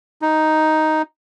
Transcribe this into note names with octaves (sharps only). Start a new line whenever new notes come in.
D#4